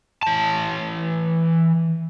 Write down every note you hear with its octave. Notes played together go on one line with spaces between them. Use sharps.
E3 A5